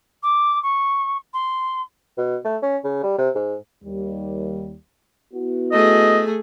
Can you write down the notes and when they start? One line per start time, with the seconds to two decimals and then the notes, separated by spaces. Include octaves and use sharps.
0.22 D6
0.62 C#6
1.33 C6
2.18 B2
2.45 A3
2.63 C#4
2.84 C#3
3.03 G3
3.18 C3
3.35 G#2
3.84 D#2 G3
5.34 B3 E4 F#4
5.72 A3 G#4 D#5